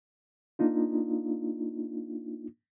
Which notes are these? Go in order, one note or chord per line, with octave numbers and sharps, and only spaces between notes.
A#3 D4 D#4 F4